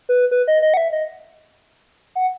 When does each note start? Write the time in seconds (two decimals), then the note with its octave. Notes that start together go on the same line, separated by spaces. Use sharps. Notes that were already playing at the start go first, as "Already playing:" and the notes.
0.09 B4
0.31 B4
0.48 D#5
0.62 D#5
0.74 F#5
0.77 E5
0.93 D#5
2.15 F#5